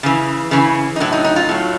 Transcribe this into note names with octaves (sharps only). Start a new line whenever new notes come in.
C#3 E3
C#3 E3
D#4
A2 F#3 E4
D#4
D#4
F4
A2 F#3